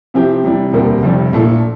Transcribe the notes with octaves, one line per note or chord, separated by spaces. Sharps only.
C3 F3 C4 E4 G4
C3 E3 G3 D4
E1 D2 C3 G3 A#3
F1 F2 C3 G3
A#1 A#2 A3 E4 A4